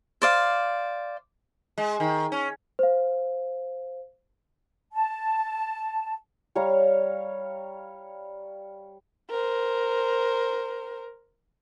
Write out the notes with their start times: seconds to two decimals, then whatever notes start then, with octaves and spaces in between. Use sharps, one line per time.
0.22 C5 D5 F5
1.78 G#3
2.00 D#3
2.32 C#4
2.79 C5 F5
4.92 A5
6.55 G3 C#5 F5 A#5
9.30 A#4 C5